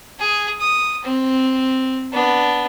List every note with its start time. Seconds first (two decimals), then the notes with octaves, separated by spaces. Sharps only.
0.19 G#4
0.60 D#6
1.04 C4
2.12 B3 D4